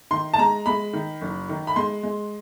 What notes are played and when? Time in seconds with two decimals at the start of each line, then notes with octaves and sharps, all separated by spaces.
0.11 D#3 C6
0.34 A5
0.38 G#3 A#5
0.66 G#3 B5
0.93 D#3
1.22 F#1
1.49 D#3
1.67 B5
1.76 G#3 C6
2.03 G#3